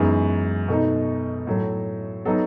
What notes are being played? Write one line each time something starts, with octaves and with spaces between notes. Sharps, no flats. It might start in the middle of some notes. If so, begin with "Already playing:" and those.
Already playing: F#2 E3 G#3 B3 D#4 G#4
B2 A3 D#4
A2 F#3 A3
F#3 B3 D#4 A4